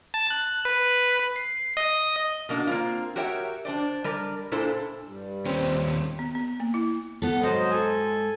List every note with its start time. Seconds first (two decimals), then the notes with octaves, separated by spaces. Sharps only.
0.14 A5
0.30 F#6
0.65 B4
1.36 C7
1.77 D#5
2.49 B2 A#3 D4 F#4
2.67 A#3 C4 F4
3.16 F#4 G4 A#4 C#5 E5 G5
3.65 D4 C5 D5
4.04 G3 A#4 D5
4.52 A#2 D4 E4 A4 C5
5.06 G2 G3
5.46 D#2 C4 C#4
6.19 B3
6.35 B3
6.60 A#3
6.74 E4
7.22 B3 A4
7.43 G#2 F#3 C5 D#5
7.71 A4 G#5